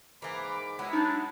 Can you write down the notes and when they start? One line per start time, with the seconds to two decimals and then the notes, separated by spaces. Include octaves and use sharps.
0.22 G#2 E3 A#3 B5 D6
0.79 F#3 G#3 B3 E4
0.93 D4 D#4